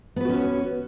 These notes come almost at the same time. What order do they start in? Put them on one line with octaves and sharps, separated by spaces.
B3 B4 F#4 C#4 C#5